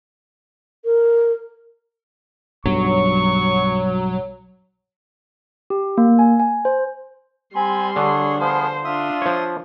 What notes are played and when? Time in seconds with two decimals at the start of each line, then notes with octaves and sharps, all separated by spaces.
0.85 A#4
2.65 B1 G2 F#3 C#6
5.70 G4
5.98 A#3
6.19 G#5
6.40 G#5
6.65 C5
7.56 G3 C4 G#5 B5 C6
7.96 D3 D4 G#4 C#5
8.41 F3 B3 G#4 C5
8.85 D4 F4 E5 C6 D#6
9.22 F3 C#5